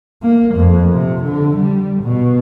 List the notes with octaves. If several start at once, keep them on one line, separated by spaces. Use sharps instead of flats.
A#3
F2
C3
D3
G3
B2